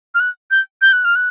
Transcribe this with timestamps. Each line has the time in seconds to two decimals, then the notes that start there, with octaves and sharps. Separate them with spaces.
0.15 F6
0.20 F#6
0.51 G6
0.82 G6
0.93 F#6
1.05 F6
1.15 F#6